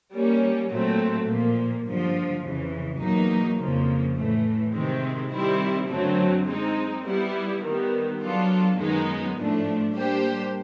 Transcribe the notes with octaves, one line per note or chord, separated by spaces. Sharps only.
G3 A#3 C#4
A#2 F#3 A3 C4
A#2 F3 A#3
G2 D3 F3
F2 C#3 E3
E2 B2 F#3 A#3 D#4
F2 C#3 F3 A#3
A2 E3 A3
C3 D#3 G#3 C4
D#3 G3 C4 E4
F#2 D3 F#3 A3 C4
G#3 C4 D#4
G3 B3 E4
D#3 G3 B3
F#3 B3 D4 F4 A4
F#2 D#3 G#3 B3 D#4
A2 F3 A3 D4
G3 A#3 D4 G4 C5